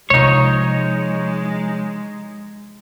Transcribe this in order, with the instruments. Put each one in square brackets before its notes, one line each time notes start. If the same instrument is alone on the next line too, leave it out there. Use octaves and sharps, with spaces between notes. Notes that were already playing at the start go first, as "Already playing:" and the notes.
[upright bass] C3 F3 [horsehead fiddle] G#3 [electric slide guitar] D#4 C#5